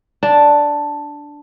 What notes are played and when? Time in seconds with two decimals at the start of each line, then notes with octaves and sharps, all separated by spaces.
0.23 D4 A5